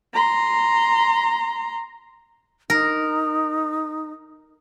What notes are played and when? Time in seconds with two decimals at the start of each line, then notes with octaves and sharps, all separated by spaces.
0.14 A#5 C6
2.70 D#4 A#4